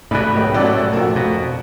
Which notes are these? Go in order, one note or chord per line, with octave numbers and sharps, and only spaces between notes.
G#2 B2 A3 D5 G#5 B5 F#6
B1 D#3 G4
A1 A2 F#3 D5 E6
F2 D4 F#4 A#4 A5
B2